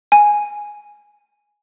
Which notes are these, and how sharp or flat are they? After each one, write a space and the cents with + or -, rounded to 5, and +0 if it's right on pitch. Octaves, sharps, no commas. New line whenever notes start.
G#5 +0